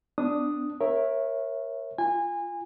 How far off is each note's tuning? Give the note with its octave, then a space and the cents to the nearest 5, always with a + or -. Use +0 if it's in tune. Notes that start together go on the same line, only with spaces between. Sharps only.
B3 +30 D4 +5 D#6 +0
A#4 +15 C#5 -20 E5 +0
F4 -15 G#5 -25